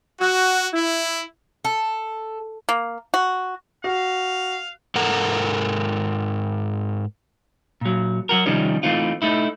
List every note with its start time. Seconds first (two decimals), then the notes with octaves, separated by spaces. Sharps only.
0.21 F#4
0.74 E4
1.65 A4
2.69 A#3
3.14 F#4
3.84 F#4 F5
4.95 G#2 A4 A#4 F#5 A#5
7.81 A#2 F#3
8.29 F#3 F#4 A#4
8.46 C3 D#3 F3 G3 C#4 D#4
8.83 E3 A3 C4 D#4 F4
9.22 A3 D#4 E4